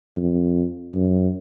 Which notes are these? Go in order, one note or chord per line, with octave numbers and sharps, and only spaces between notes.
F2
F#2